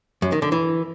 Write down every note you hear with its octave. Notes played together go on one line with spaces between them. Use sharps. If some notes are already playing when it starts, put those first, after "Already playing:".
F#2
D#3
D3
E3